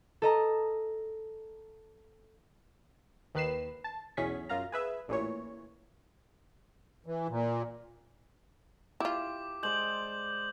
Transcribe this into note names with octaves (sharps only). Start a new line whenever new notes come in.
A4 D#5 A#5
D#2 D#3 B4 C7 E7
A5
B1 E2 C#4 G#4 C#6 B6
F#2 F4 F5 A#5
G#4 B4 E5
A1 A#2 E3 C#5
E3
A#2
E4 F4 G4 D6
G#3 C5 D5 G6 F#7